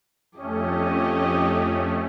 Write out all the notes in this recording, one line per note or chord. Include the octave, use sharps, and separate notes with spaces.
F2 A3 C#4 G4 D#5